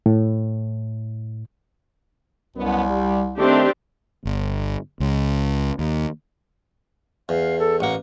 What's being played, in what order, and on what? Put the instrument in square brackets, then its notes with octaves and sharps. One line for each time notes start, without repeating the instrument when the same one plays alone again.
[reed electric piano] A2
[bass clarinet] C2 [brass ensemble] F#2 B2 B3
[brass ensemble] G3
[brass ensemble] D#3 A3 [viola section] C4 D4 G4
[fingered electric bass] G1
C#2
D#2
[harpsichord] E2 [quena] F5
[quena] A4
[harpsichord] A1 A#3 [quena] F#5